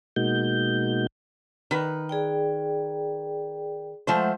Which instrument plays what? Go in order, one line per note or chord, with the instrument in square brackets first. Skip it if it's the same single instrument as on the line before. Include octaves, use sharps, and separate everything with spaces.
[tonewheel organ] B2 G#3 A#3 D#4 F#4 G6
[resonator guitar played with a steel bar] D#3 B4
[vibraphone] G#4 D5 G5
[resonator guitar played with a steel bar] F3 A3 C5 [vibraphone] G#3 E5 F#5